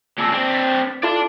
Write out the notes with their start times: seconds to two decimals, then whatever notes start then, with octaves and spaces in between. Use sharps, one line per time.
0.18 A#2 C#3 A5 E6 A#6
0.32 C4 D4
0.50 A6 B6
1.03 E4 F4 A4 D5 A5